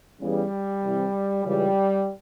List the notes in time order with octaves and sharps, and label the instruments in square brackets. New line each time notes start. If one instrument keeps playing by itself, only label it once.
[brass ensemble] E2 C#3 E3 G3
C2 C3 E3
C#2 C#3 E3 G3